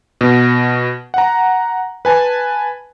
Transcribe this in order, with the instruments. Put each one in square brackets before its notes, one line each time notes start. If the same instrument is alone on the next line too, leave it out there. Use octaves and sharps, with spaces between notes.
[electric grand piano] B2
F#5 A#5
B4 G#5 A5